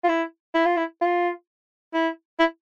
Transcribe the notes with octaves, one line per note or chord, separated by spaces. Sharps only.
F4
E4
E4
F4
E4
F4
E4
E4